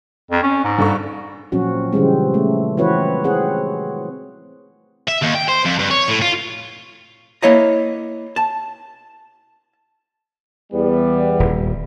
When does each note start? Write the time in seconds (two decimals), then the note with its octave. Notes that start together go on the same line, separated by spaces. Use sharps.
0.31 F2
0.43 C#4
0.64 G#2
0.78 G2 A4 C#6
1.52 A#2 F3 F#3 C4 C#4 F#4
1.92 C#3 E3 F3 G3 G#3 C4
2.34 A3
2.77 E3 F3 C4 F#4 B4 C#5
3.24 C4 G#4 C#5 F#5
5.08 E5
5.22 D#2
5.35 G5
5.48 C5
5.65 F2
5.79 G2
5.91 C#5
6.08 A2
6.22 F4
7.43 A#3 E4 C#5 D#5 A#5
8.36 A5
10.72 E2 G3 B3
11.40 D#1